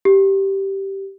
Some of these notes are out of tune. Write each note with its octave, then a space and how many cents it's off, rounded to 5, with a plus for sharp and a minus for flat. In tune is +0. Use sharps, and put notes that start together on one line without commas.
G4 -10